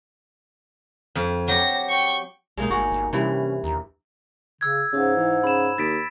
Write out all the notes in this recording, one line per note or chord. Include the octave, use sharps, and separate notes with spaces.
F2
F#3 G4 A#6
G5 C#6
B1 G#3 A#3 D#4
G1 F#4 G#5
G1
G2 C3 E3 C#4
D#2 A#5
C#3 E6 G#6
G#2 C#3
E3
C#3 B5 E7
D#2 A6 B6 D7